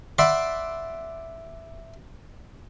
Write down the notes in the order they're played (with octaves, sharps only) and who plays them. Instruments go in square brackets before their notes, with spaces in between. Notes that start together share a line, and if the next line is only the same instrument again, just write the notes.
[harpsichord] D5 E5 F#5 B5 C6